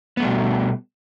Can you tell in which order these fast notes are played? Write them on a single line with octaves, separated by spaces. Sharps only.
B3 A3 G3 B2